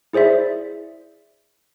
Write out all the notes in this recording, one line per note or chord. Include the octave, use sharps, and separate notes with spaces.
E4 G#4 C5 D5 E5